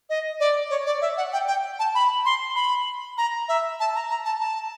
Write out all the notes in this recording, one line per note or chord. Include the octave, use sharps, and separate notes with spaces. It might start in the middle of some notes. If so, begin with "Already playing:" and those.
D#5
D5
C#5
D5
E5
F#5
G5
G5
A5
B5
C6
B5
A#5
E5
A5
A#5
A#5
A5
A5